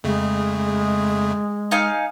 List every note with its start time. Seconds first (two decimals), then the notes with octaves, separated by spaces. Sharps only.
0.04 F2 C#3 G#3 A3
1.71 D#4 F5 G#5